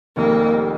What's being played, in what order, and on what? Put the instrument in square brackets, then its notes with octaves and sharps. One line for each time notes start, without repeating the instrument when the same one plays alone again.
[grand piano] F1 F2 D#3 G3 [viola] A#3